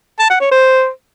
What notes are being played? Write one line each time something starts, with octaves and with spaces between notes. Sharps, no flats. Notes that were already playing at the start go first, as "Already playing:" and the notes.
A5
F#5
C#5
C5